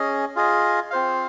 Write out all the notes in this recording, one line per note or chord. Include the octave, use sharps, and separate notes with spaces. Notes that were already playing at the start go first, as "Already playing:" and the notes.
Already playing: C#4 G#4 D#5
F4 G#4 D#5
C4 F4 C5 F5